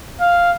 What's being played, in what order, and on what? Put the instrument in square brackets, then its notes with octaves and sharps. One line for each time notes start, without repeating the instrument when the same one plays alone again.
[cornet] F5